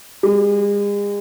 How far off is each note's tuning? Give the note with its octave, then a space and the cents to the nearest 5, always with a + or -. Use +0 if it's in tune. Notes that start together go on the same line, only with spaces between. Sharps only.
G#3 -40